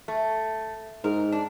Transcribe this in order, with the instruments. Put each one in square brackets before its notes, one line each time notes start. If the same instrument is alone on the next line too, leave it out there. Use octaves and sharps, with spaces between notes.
[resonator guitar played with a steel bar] A3
[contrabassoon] G#2 [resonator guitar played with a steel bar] A#4
[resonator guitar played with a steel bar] D4